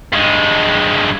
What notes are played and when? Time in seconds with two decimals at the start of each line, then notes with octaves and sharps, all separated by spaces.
0.13 G2 G#3